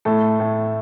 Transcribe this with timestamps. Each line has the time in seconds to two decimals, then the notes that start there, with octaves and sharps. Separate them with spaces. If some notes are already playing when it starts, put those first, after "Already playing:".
0.05 A2 A3 A4
0.40 A2